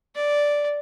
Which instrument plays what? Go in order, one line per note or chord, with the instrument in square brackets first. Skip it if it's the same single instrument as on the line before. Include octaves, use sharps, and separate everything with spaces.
[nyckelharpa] D5